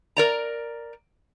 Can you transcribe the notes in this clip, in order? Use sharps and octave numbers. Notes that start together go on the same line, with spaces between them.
A#4 D5 A#5